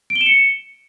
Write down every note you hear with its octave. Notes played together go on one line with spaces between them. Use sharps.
D7
G7
E7
C#7